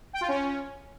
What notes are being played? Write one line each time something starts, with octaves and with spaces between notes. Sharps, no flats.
G5
F4
C#4